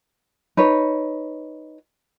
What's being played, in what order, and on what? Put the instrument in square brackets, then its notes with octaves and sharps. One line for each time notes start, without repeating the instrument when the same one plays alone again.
[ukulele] D#4 B4 C#5